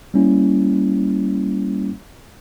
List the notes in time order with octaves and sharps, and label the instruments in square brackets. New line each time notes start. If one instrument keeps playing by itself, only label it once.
[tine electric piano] G3 A#3 C#4 E4